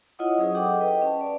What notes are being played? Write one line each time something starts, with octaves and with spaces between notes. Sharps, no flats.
E4 F4 C#5 D#5 F#5 D#6
F#3 C#4 G#4 C5 D#6
G4 A4 D#5 F#5 G5 D6
B4 D#5 G5
C#4 A5
D5